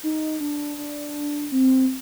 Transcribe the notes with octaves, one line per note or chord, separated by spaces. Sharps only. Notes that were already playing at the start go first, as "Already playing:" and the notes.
D#4
D4
D4
C4